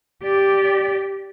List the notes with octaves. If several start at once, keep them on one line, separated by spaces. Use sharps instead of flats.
G4 D5